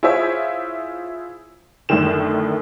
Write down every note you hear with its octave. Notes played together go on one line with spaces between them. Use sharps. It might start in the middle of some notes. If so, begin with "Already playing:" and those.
E4 F4 G#4 C5 C#5 E5
F#2 A2 D3 D#3 E7